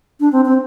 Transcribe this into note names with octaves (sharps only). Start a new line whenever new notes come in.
D4
C4
C4